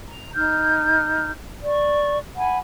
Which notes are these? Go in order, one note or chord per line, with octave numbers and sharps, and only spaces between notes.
A#5
D#4 F6 G6
D5 C#6
F#5 G#5 B5